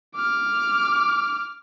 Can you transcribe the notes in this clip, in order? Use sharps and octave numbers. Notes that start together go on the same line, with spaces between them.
D6 F6